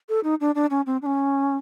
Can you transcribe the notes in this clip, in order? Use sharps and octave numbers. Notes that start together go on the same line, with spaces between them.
A4
D#4
D4
D4
C#4
C4
D4
C#4